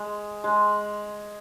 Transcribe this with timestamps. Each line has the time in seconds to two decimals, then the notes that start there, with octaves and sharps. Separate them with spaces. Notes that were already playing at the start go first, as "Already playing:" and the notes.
Already playing: G#3
0.44 G#3